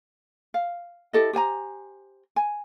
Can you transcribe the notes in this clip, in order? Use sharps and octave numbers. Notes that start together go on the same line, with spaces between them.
F5
E4 G4 A4 D#5
G4 C5 G#5 A#5
G#5